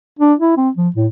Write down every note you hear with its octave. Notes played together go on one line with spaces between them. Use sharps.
D4
E4
C4
F3
A2